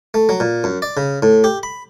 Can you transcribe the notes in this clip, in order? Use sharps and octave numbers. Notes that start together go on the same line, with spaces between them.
A3
F#3
A#2
F#2
D5
C#3
A2
G4
B5